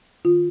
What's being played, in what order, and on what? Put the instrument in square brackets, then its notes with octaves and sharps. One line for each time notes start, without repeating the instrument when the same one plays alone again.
[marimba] D#3 F4